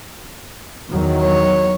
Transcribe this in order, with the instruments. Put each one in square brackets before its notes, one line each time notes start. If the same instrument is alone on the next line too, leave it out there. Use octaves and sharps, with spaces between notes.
[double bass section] E2 D#3 F#3
[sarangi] C#5